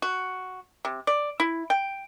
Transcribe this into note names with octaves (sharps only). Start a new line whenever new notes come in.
F#4
C3
D5
E4
G5